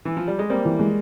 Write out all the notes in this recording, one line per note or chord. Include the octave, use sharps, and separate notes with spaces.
E3
F3
G3
G#3
G3 A#3 C4
E3
G#3